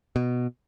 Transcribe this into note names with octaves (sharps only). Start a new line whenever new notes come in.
B2